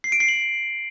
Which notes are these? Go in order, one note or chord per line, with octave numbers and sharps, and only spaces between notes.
C7
D7
C7
F#7